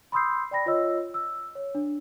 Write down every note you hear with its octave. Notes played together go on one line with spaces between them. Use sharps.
B5 C6 D#6 E6 G6 C7
D5 G5 B5 A#6
F4 C#5 D#5 E6
E6
C#5
D4